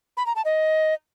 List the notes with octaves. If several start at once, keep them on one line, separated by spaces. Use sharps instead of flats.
B5
A#5
A5
D#5